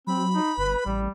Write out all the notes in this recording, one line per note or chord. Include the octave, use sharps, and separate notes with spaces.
F#3 C4 B5
D#4
G1 B4
A1 G3